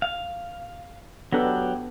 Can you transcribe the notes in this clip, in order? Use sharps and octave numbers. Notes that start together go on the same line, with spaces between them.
F5
F#3 B3 D4 G4 A4